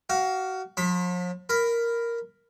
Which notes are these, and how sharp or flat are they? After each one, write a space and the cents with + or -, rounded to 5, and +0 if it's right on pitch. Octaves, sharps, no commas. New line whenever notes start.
F#4 +25 F5 +0
F3 +45 B5 +15
A#4 +0 B5 +10